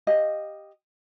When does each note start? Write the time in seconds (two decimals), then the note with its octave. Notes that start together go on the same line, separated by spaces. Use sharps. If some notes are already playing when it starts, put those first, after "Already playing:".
0.07 G4 D#5 F5